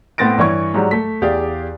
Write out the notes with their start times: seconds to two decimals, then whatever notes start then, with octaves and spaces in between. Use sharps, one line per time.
0.18 A2 B3 C4 A6 A#6 D7
0.38 G2 E3 C#5 C#6
0.74 G#2 F#3 G3
0.91 A3 B6
1.22 E2 G4 G#4 D5 F5